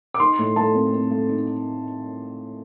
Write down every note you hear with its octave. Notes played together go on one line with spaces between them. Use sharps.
D6
D#4 C6
A2
A3 A5
C4
C4
A3
D#4